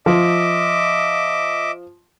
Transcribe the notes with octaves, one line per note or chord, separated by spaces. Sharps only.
F3 D#5 E5 D6